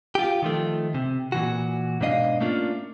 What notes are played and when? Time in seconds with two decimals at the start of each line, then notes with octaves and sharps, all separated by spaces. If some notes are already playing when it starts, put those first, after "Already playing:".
0.15 F4 G4
0.42 D#3 F3 A3
0.94 C3
1.32 A#2 E3 F#4
2.01 G#2 B2 D4 D#5 F5
2.40 A3 A#3 C#4 D4 F4